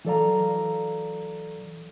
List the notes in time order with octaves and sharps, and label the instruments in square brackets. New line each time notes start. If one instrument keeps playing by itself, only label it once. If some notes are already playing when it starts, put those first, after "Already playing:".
[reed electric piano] E3 F#3 A4 D5 F5 A#5